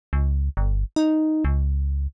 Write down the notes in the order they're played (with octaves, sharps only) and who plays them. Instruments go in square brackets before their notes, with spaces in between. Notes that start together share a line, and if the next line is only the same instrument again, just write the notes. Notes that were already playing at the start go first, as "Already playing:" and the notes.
[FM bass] C#2
G1
D#4
C#2